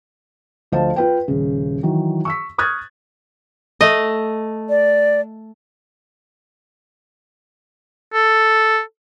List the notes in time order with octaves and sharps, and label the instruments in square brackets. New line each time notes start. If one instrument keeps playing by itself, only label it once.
[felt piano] D2 F3 C5 D#5 F5 A5
F4 B4 G5
D#1 C#3
D#3 E3 F#3 F#4
C#6 E6 B6
C#6 D#6 F6 F#6 G#6 A6
[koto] A3 D#5
[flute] D5
[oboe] A4